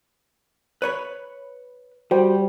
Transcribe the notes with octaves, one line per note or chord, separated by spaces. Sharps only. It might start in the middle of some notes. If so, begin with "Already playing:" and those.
B4 C#5 B5
G3 F#4 C5 G5